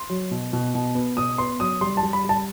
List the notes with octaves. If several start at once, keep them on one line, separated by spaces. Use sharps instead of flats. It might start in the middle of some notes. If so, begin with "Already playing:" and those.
Already playing: C6
F#3
B2
B2
B2
B3
B2 D#6
B3 C6
F#3 D#6
G3 C6
A5
G3
B5
G3 A5